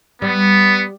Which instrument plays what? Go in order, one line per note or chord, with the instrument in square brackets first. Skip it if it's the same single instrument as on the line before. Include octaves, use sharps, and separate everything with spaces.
[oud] G3 [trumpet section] B3